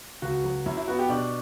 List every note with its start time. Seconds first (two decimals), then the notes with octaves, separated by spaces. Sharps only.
0.22 C#2 F#4
0.44 F#3
0.66 F#2 E4
0.77 E4
0.88 B3 F#4
0.99 G4
1.09 B2 D4